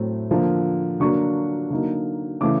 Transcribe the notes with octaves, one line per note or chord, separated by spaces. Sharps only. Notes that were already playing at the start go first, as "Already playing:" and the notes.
Already playing: A2 F#3 A3 C4
D3 F3 A#3
D3 F#3 A#3 D4 C#6
D3 F#3 A#3 D#4
C#3 E3 A3 D6